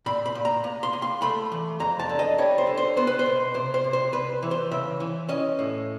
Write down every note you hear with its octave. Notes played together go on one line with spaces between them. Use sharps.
A#2 B5
B5
A#2
A#5
A#3
C6
A#3
C6
A3 B5
E3
F2 A#5
A5
D3
D#5
G3 C#5
C5
D3
C5
B3 C5
B4
C5
B2
C3 C5
C5
C3
C5
C2 B4
E3
C5
C#3 E5
E3
C#4 D#5
A2